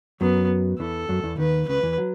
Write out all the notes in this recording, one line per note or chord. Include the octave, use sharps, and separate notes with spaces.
F#2 F#3 B3
E2 E3 A4
F#2 F#3
E2 E3
D#2 D#3 B4
C#2 C#3 B4
E2 E3
F#3